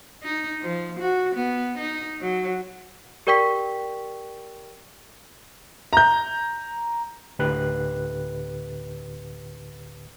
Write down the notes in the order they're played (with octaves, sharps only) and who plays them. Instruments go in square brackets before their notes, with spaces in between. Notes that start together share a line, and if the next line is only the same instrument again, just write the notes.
[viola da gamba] D#4
F3
F#4
B3
D#4
F#3
[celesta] G4 A#4 D5 G5 C#6 B6
[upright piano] A#5 G6
[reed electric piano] D2 A2 D3 G4 B4 F#6